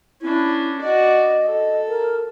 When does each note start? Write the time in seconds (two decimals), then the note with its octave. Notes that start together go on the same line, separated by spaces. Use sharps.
0.22 C#4 D4 E4
0.81 F#4 D5 D#5
1.48 A4 D#5
1.88 A#4